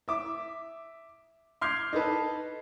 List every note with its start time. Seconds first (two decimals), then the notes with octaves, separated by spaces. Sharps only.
0.08 E5 D6
1.61 C6 D6 F6 G6 G#6 C7
1.93 D#4 A4 B4 A5